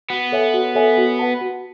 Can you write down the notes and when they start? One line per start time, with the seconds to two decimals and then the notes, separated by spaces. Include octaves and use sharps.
0.10 B3 F#4
0.32 A4 C#5 E5 G#5
0.54 F#4
0.75 A4 C#5 E5 G#5
0.97 F#4
1.19 B4 F#5 A5
1.41 F#4